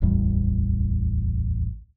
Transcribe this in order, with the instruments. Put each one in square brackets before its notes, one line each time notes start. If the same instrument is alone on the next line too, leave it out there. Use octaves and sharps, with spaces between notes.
[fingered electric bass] D1 A1 E2 G3